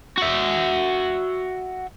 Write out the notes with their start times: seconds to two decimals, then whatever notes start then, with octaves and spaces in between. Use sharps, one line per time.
0.17 F#4 E5